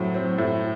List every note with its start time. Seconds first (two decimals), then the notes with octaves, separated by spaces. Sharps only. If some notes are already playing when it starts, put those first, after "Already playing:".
Already playing: A2 F#3 C4
0.14 C4
0.38 A2